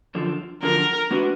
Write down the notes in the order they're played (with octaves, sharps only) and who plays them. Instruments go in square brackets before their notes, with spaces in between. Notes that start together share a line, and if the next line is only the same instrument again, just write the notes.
[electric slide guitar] F#2 D3 F3
[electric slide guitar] F#2 D3 F3 [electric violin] A#4
[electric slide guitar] G#3 D4 F#4 B4